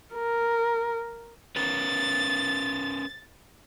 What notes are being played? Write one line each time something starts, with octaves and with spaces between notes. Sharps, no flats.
A#4
C#4 A#4 B4 A6